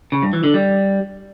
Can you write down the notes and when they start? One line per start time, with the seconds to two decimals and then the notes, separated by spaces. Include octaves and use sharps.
0.12 C#3
0.23 G2
0.33 E3
0.44 D3
0.54 G3